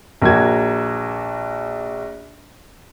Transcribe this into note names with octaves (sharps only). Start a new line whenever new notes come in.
A#1 A#3 F#4 G#6